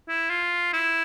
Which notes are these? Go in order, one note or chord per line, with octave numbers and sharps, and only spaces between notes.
E4
F4
E4